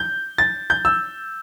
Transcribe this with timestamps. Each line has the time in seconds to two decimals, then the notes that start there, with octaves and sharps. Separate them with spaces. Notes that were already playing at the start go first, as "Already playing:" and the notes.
Already playing: G6
0.38 A6
0.70 G6
0.85 E6